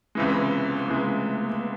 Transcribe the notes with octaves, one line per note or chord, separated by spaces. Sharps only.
C#2 C3 E3 G#3 C#4
B3
B3
B3
C#2 C3 E3 G#3 A#3
A3
A3
A#3
B3